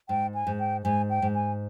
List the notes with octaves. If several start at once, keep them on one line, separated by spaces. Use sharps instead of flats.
G#2 G5
G#5
G#2
G5
G#2 G#5
G5
G#2
G#5